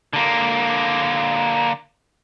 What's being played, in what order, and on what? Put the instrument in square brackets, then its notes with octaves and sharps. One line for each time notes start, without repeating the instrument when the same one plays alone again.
[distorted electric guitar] D3 A#3